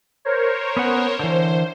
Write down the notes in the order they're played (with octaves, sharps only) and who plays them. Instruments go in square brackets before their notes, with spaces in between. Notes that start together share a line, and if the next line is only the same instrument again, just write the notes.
[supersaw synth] A#4 C5 C#5
[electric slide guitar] B3 C#4 F#5
[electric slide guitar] D3 E3 [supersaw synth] C5